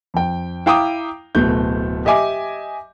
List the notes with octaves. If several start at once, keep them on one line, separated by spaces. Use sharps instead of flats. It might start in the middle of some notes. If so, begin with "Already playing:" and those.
F2 G5
E4 F5 G5 A#5 D6 D#6
D1 B2 A3 G6
G4 D#5 E5 G#5 D6